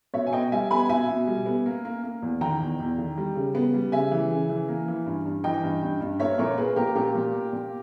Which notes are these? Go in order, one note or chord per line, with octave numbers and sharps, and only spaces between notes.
B2 C#5 E5
G#5
B3 D#5 G5
G3 E5 G#5
B3 G#5 B5
B2 E5 G#5
B2
G3
B3
A#3
A#3
A#3
E2
D#3 G5 A#5
E2
E2
D#3
G3
C#3
B3
G3
C#3 E5 G#5
E3
C#3
E3
A#3
E3
G2
G2
E3 D#5 G5
G2
G2
G2
A#3 C#5 E5
A#2 A#4 C#5
A#3 G#4 B4
A#2 G4 A#4
A#2 G4 A#4
A#2
A#3
A#2